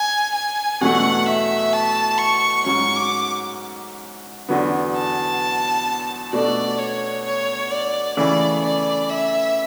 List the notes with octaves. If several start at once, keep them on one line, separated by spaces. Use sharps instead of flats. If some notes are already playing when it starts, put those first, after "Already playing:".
Already playing: G#5
G#5
E2 B2 F#3 A3 F#5
E5
A5
C#6
G#2 F#3 C#4 C#6
D6
E2 D3 F#3 B3
A5
B2 A3 D4 A4 D5
C#5
C#5
D5
C#3 E3 A3 D5
D5
E5